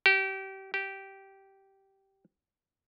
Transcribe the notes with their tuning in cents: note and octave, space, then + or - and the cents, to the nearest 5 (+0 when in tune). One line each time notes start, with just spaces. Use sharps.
G4 -30
G4 -15